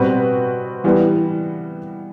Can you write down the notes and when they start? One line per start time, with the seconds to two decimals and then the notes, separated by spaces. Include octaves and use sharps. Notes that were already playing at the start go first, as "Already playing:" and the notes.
Already playing: B2 G3 C4 F#4 B4
0.84 E3 G3 B3